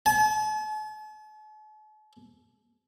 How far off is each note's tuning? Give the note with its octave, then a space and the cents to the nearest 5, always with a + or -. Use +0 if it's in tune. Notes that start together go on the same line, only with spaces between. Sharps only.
A5 -45